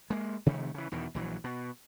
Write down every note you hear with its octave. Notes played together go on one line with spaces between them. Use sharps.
G#3 A#3
C3 D#3 F3 A3
C#3 E3
E2 B2 D#3
A#1 E3 F#3
B2